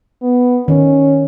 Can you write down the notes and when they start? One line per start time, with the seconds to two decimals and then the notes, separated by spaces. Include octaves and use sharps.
0.22 B3
0.68 D#3 C#4